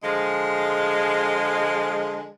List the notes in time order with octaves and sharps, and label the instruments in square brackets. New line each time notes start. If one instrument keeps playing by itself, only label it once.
[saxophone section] D3 F3 G#3